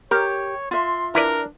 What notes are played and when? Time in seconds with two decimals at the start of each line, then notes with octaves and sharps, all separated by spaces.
0.11 G4 A#4 C#5
0.71 F4 E5 C6
1.15 D4 E4 A#4 B4 D5